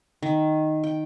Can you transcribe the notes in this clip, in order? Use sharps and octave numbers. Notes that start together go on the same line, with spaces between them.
D#3
G5